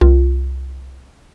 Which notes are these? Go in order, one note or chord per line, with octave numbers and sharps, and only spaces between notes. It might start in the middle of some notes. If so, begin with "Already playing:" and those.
C2 F4